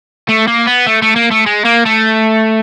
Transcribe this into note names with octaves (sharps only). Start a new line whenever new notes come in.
A3
A#3
B3
A3
A3
A#3
A3
G#3
A#3
A3